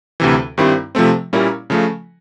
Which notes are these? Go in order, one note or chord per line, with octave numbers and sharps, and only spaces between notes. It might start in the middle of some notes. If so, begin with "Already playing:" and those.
D2 C3 E3
G2 D#3 G3 C4 E4
C3 F3 A3 C4
A#2 G3 A#3 C#4 E4
C#3 F3 A3